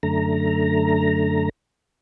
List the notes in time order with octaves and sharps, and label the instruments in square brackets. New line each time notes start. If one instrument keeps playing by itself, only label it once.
[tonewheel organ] F#2 D3 A3 A#5